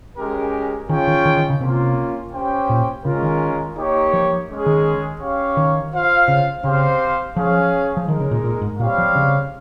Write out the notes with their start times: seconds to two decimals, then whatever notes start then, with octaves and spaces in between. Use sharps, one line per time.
0.18 G#3 C#4 G4 A#4
0.89 D#3 C#4 F4 G#4 C#5 G5
1.07 D#3
1.25 D#3
1.37 D#3
1.50 C#3
1.61 C3 A#3 C#4 F4
2.33 C#4 G4 C5 G5
2.70 A#2
3.05 C#3 G#3 C#4 F4 A#4
3.23 D#3
3.77 A#3 D#4 G4 C#5
4.13 F3
4.49 G#3 C#4 G#4
4.66 D#3
5.21 C#4 G4 C#5 F5
5.57 D#3
5.92 F4 C5 F5
6.28 C#3
6.64 C#3 C4 G4 C5 F5
7.36 F3 C#4 G#4 C#5 F5
7.97 F3
8.08 D#3 G#3 D#4 A#4
8.20 C#3
8.31 A#2
8.44 A#2
8.62 G#2
8.79 A#2 G3 C4 G4 C#5 F5
8.98 F3
9.15 C#3